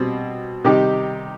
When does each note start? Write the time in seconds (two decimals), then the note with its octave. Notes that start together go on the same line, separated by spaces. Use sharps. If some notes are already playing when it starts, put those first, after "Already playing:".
Already playing: B2 G3 C4
0.65 C3 D#3 G3 D#4 G4